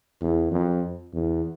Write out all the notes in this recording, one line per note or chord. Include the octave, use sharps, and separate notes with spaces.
E2
F2
E2